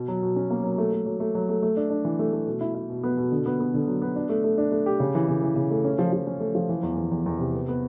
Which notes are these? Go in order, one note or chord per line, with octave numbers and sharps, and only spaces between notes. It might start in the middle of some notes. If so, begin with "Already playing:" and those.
Already playing: B2
F#3
B2
C#4
A#3
F#3
A3
A3
F#3
A3
F#3
A3
A3
D4
D4
E3
A3
A3
B2
E4
E4
B2
B3
B2
D3
B3
B3
D3
F#3
B3
D4
A3
A3
D4
A3
G4
C#3
E3
C#3
E3
C#3
A3
C#4
F3
F3
C#4
A3
F3
E3
E2
E2
E2
E2
C3
B3
B3